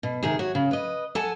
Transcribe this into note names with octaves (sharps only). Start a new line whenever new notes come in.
B2
C3 D#3 G#4
F#4 C#5
C#3
B4 D#5
A4 F#5 G#5 A5